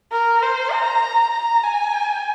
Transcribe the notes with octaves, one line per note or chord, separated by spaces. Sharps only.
A#4
C5
A#5
A#5
G#5